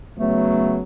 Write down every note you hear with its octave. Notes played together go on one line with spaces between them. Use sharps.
C#3 F#3 A3 B3